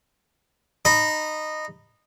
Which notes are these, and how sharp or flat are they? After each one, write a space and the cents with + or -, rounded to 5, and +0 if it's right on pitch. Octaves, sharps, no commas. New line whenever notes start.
D#4 -15 B5 +0